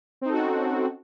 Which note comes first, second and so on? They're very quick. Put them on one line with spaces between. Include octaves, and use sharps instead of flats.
C4 D#4 A4 F#4 C#4